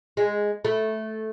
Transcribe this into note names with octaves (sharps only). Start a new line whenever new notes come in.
G#3
A3